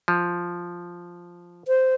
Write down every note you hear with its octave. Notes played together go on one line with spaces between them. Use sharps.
F3
C5